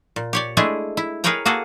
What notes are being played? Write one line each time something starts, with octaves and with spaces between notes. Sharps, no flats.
A#2
G4 C#5 D5
G#3 A3 D4 E4 G#4
E4
G#4 A#4 B4 C#5 G5 A#5
A#3 F#4 G#4 A4